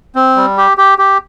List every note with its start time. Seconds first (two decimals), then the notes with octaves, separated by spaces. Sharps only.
0.15 C4
0.36 G3
0.57 G4
0.77 G4
0.98 G4